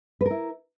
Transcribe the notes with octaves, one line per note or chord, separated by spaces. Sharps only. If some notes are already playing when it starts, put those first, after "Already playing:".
E4 A#4 B4